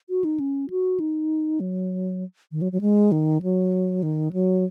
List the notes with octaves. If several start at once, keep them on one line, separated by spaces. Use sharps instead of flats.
F#4
D#4
C#4
F#4
D#4
F#3
D#3
F#3
F#3
G#3
D#3
F#3
D#3
F#3